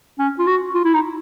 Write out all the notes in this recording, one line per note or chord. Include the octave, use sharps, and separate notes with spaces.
C#4
F4
F#4
F4
E4
D#4